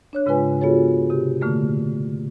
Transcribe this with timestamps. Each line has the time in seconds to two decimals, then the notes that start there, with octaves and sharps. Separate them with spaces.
0.13 D4 C#5 F#6
0.26 G#2 C#3 G#3 F4 B4 G#5
0.61 B3 F4 F#4 G#4 A4 C#5
1.10 C3 G4
1.41 A#2 D3 A3 A#3